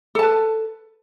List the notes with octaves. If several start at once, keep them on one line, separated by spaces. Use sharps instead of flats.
A4 B4 A5